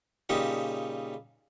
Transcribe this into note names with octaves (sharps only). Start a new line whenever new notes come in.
A#2 C#3 G3 D#4 G4